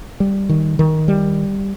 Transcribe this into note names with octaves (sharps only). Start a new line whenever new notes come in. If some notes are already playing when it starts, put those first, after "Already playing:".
G3
D#3
D#3
G3